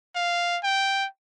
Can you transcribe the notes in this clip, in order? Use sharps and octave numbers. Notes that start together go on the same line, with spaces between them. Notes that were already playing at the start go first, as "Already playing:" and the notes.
F5
G5